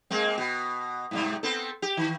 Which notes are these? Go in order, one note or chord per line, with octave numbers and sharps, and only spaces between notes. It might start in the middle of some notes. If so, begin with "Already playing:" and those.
G#3 A#3 C4
B2
G#2 C3 G3
B3 C4 A4
G4
D#3